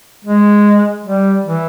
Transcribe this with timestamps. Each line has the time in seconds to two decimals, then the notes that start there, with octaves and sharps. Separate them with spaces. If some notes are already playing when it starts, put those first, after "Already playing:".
0.25 G#3
1.04 G3
1.44 E3